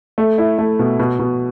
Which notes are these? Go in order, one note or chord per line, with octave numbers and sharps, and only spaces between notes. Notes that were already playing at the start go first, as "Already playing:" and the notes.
A3
E4
A3
B2
B2
B2